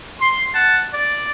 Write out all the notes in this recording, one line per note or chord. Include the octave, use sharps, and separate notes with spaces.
C6
F#5 A5
D5